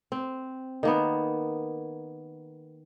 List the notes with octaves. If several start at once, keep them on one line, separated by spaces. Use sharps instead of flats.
C4
D#3 A#3 B3